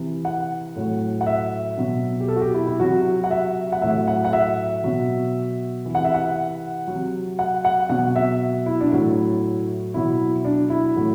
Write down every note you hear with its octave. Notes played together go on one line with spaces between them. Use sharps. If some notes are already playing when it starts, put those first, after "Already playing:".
Already playing: C3 E3
F#5
A2 F#3
F#5
E5
B2 F#3
G4
A4
F#4
G4
E4
E4
C3 F#3 F#4
F#5
E5
F#5
A2 F#3 E5
F#5
F#5
E5
B2 F#3
C3 E3
F#5
E5
F#5
C3 F#3
F#5
F#5
B2 F#3 F#5
E5
E4
D4
A2 F#3 E4
B2 F#3 E4
D4
E4
A2 F#3